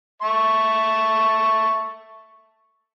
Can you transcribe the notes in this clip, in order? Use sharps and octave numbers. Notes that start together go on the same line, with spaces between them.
E5 A5 C#6